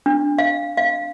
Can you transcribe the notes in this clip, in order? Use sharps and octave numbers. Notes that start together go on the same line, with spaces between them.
D4
F5
F5